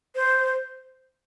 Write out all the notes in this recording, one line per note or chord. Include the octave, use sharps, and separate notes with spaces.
C5